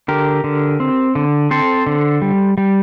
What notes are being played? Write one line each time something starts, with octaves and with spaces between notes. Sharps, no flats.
D3 G4 A#4
D3
C4
D3
C4 A4 C5
D3
G3
G3